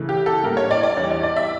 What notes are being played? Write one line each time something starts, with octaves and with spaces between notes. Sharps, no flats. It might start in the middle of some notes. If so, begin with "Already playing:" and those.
Already playing: C#3 E3 A3
G4
A4
A2 G3 A#3 A#4
C#5
D5
D5
E2 E3 G3 C#5
D5
D5
E5